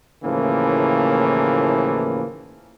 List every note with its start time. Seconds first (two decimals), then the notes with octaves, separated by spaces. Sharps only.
0.24 D#2 A2 C#3 E3 F3 A#3